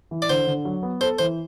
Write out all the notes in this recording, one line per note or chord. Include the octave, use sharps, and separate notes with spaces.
E3
D5
D3 C5
D3
F#3
B3
A4 C5
E3 C5